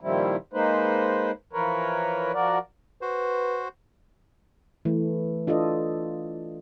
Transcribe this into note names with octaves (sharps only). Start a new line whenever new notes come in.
A#2 D#3 F3 G3 C4 E4
G#3 A#3 D#4 B4 C5
E3 F3 A#4 B4 C#5
F3 F#4 A#4 D5
F#4 B4 C5
E3 A3
D4 F4 A4 D5 D#5